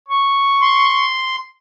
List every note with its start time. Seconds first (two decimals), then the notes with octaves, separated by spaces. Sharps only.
0.08 C#6
0.61 C6